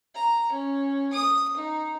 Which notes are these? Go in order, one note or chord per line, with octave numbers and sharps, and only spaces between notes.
A#5
C#4
D#6
D#4